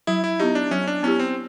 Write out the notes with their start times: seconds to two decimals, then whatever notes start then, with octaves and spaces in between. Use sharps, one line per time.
0.07 F#3 E4
0.24 E4
0.40 B3 D#4 E4 G4
0.55 D4
0.71 F#3 C#4
0.87 D4
1.03 B3 C#4 E4 G4
1.19 C4